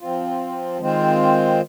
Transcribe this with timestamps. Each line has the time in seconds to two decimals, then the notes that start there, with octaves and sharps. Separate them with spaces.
0.01 F3 C4 F4
0.81 D#3 G#3 C4 F4 C5